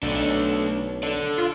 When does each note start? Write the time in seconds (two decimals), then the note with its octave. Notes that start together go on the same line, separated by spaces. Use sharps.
0.03 B1 A3 D4
1.03 A4 D5
1.38 F4